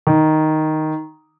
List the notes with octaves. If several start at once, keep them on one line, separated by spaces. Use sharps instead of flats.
D#3